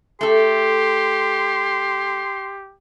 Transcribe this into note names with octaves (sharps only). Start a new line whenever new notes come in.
A3 G4 A4 C6